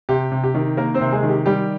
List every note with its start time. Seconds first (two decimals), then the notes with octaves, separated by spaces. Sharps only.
0.09 C3 G4
0.32 C3
0.44 G4
0.54 D#3
0.77 A#3 A#4
0.94 C4 C5
1.01 C3
1.12 G#3 G#4
1.23 D#3
1.29 G4
1.46 G3 G4